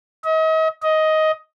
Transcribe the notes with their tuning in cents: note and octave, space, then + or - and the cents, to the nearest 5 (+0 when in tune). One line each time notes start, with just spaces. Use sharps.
D#5 +40
D#5 +10